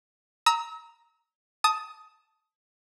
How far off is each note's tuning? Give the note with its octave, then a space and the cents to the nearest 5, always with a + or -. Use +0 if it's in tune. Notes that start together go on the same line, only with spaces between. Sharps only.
A#5 +0 E6 -40
A5 +0 D#6 +15